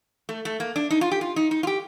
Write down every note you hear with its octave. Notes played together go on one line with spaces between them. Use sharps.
A3
A3
A#3
D4
D#4
F4
G4
F4
D#4
D#4
F4
G4